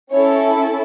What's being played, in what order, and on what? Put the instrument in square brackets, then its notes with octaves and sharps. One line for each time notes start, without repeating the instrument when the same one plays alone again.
[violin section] C#4 E4 A4 C#5